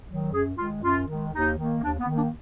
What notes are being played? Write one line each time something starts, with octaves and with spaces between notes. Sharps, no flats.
D#3 F#3
F#2 G#4
D#3 G#3 F4
F#2 F4
D#3 G#3
D#2 D#4
D#3 A#3
D#2 D4
B3
D#3 A#3
D4